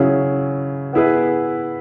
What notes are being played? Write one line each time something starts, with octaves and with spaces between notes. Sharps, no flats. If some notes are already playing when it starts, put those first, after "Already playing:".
Already playing: C#3 F#3 C#4 E4 G#4
B3 E4 G#4 B4